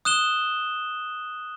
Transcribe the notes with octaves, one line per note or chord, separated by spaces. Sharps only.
D#6 F#6 E7 G7